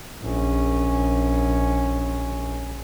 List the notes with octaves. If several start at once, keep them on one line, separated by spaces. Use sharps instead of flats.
A#1 C#4